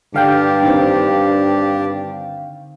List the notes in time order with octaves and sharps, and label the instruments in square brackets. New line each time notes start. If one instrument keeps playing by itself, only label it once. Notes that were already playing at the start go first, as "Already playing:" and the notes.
[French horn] G2 [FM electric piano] D3 F5 G5 [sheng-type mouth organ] D4 G4
[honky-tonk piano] D#3 C4